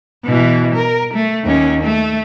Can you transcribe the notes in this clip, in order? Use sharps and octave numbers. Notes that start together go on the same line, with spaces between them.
B2 E3
A#4
A3
D#2 C#4
A3